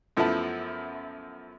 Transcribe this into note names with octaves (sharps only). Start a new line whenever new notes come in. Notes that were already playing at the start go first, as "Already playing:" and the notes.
F#2 F3 A3 B3 E4 A5